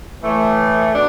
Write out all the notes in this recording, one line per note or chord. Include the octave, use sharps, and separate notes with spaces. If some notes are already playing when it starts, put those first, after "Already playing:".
A2 E3 A3
B2 D4